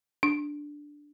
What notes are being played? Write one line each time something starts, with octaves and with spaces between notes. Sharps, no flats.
D4